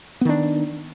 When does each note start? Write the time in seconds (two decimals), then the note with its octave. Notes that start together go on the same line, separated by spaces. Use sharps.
0.21 B3
0.25 D#3
0.29 D4